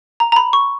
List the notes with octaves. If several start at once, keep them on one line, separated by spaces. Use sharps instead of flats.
A#5
A#5
B5
C#6